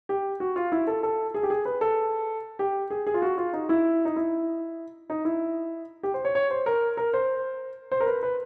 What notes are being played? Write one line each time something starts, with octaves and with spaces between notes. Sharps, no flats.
G4
F#4
F4
E4
A4
A4
G#4
G4
G#4
B4
A4
G4
G#4
G#4
F4
F#4
F4
D#4
E4
D#4
E4
D#4
E4
G4
C5
C#5
C#5
C5
A#4
A#4
C5
C5
A#4
B4
B4